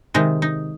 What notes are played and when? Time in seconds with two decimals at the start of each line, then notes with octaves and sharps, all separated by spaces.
0.14 C3 D#3 G#3 D#4
0.42 D#4